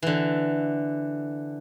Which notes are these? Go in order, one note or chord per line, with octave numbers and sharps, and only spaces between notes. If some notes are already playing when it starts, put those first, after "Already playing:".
D3 E3